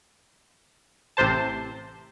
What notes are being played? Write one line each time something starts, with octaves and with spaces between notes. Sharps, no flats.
A1 C3 C5 A5